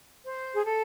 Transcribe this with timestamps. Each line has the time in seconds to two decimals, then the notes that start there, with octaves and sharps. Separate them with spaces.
0.24 C5
0.54 G#4
0.66 A4